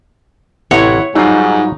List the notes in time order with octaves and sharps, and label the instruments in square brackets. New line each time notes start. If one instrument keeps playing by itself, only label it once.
[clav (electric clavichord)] A1 C3 A#5 [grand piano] E4 F#5 [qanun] C#5
[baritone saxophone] G#2 [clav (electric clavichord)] F#3 G3 F4 [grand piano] D#4